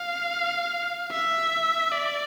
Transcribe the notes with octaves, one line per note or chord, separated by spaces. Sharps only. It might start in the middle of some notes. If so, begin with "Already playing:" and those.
Already playing: F5
E5
D5